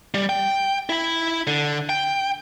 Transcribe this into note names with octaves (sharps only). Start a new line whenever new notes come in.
G3
G5
E4 B5
D3
G5